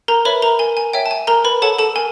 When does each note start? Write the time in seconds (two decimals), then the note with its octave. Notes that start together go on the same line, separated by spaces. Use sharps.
0.08 A#4 A#5
0.25 B4 C#5 E5 B5
0.42 A#4 A#5
0.59 A#4 G#5
0.77 G#5
0.93 C#5 E5 G5
1.06 A5
1.11 G#5
1.27 A#4 A#5
1.45 B4 B5
1.62 A4 C#5 F#5 A5
1.79 A4 A5
1.96 A#4 G#5